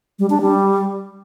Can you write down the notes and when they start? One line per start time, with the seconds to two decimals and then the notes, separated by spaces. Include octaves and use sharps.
0.19 G3
0.30 D4
0.41 G3